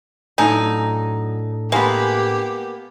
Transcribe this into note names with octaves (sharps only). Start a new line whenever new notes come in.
F#2 A2 D4 D#4 A4 G#5
G#3 A#3 B3 G4